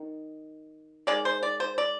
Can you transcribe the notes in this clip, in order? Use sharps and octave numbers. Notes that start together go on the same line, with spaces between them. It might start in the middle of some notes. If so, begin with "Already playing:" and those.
Already playing: D#3
D#3 G#3 D5
C5
D5
C5
D5